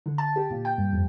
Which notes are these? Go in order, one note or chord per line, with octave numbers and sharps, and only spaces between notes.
D3
A5
G4
A#2
G5
G2
F2